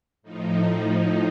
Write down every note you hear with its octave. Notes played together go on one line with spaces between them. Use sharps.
A2 F3 D#4